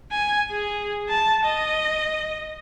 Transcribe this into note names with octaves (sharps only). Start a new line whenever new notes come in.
G#5
G#4
A5
D#5